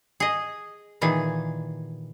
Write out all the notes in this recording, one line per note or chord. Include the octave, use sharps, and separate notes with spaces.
G#4 D#5
A#2 D#3 E3 G#4